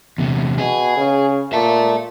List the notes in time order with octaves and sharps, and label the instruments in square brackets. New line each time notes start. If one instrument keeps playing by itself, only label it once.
[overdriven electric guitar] E2 C3
[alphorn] B2 [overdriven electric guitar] G#4
[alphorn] C#3
[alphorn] A#2 [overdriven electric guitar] E5 A5